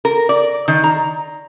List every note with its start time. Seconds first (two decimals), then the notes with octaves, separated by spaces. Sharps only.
0.05 A#4
0.29 D5
0.68 D#3
0.84 A#5